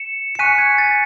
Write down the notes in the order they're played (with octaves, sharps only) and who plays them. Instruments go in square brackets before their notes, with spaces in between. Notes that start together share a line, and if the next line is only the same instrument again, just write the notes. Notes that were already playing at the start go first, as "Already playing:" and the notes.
Already playing: [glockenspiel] C#7 E7
C#7
G#5 C#6 F#6 B6 D#7
G#6 B6
A6